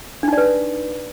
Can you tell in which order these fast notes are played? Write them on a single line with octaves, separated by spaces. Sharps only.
D4 D#4 D5 B4